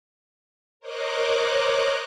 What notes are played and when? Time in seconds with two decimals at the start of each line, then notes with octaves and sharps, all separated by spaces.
0.80 A#4 C5 C#5 D#5 D6 F#6